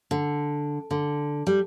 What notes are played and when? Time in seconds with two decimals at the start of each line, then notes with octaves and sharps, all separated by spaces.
0.11 D3
0.91 D3
1.47 G3